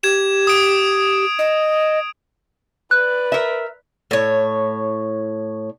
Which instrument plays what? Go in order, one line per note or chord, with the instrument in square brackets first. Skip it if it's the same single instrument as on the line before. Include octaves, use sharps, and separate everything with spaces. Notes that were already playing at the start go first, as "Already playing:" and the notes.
[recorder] G4 [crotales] G#6 E7
[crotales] D#6 D7
[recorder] D#5
[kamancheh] B4 D5 [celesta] F#6
[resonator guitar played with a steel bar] A#4 E5
[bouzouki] A2 C#5